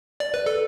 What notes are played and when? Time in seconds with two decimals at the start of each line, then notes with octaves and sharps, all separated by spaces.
0.20 D5
0.34 B4
0.46 A4